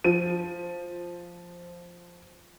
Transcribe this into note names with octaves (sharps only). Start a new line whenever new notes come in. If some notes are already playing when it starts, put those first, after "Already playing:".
F3 D#7